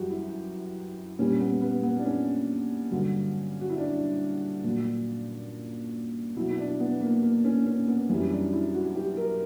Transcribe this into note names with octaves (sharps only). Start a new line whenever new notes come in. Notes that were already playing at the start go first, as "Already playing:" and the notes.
Already playing: F#2 E3 G3 F#4 G4
E4
A#2 G3 C#4
B3
B3
B3
D4
C#4
G2 D3 F#3
F#4
E4
D4
A#2 F#3
B2 F#3 E4
E4
D4
B3
A#3
A#3
C#4
C#4
B3
F#2 E3 G3 C#4
D4
E4
F#4
G4
A#4